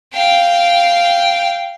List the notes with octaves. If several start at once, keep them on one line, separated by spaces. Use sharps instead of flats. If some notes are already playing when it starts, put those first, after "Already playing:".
F5 G5